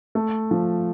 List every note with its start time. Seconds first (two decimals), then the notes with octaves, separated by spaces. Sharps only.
0.15 A3
0.51 F3